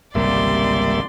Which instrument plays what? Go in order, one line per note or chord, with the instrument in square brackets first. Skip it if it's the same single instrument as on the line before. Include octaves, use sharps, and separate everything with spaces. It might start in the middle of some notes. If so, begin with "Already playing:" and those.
[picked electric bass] G#1 C#2 C3 [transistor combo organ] G3 A#3 E5 [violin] D5 C6